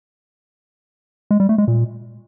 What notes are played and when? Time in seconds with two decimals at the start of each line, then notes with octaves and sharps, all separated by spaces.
1.31 G#3
1.40 G3
1.49 A3
1.58 G#3
1.68 A#2